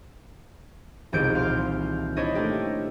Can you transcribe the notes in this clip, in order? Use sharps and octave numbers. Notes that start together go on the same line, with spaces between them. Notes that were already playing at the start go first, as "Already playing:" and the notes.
E1 C2 A#2 D#3 G6 D7
F5 C6 F6
D4 E4 C5 C#5 D#5
A3 A#3 G4